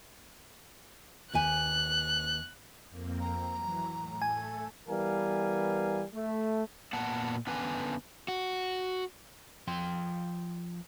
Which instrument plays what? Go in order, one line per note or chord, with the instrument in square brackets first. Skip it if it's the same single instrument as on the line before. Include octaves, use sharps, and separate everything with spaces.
[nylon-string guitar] D#2 B4 G#5 [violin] F#6
[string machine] F2 A#3 C4
[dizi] A#5
[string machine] E3 F#3
A2
[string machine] A3 A4 [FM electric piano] G#5
[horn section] E3 G3 B3 A#4 F5 G#5
A3
[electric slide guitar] A#2 A#3 B3 F#5 A5
D3 B3 C#4 D4 B4 G#5
[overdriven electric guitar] F#4
[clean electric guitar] F3 G5 C6